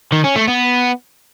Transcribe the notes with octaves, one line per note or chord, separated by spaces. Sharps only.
D#3
C#4
A3
B3